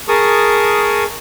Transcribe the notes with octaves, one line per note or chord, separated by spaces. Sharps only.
G#4 A#4 A5 C#6 D#6